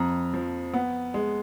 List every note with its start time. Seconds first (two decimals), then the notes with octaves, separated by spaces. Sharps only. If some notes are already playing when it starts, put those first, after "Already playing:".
Already playing: F2 A#5
0.33 F3
0.74 B3
1.14 G#3